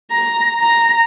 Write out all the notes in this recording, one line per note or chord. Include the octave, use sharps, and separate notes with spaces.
A#5
A#5